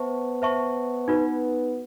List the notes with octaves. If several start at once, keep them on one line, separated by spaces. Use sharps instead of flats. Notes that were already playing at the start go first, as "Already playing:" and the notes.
Already playing: B3 C5 E5 A5 C#6
C5 E5 A5 C#6
D#4 F#4 B4